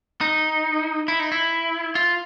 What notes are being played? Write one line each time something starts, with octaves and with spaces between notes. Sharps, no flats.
D#4
E4
D#4
E4
F4